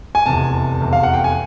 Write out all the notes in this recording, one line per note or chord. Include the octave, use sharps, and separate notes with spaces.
G#5
F1 E2 C3 A5
F1 E2 C3
F5
F#5
G5
G#5